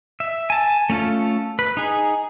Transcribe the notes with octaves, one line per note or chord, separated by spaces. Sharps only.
E5
G#5 A5
A3 C#4 F4 A4
B4
D#4 G#4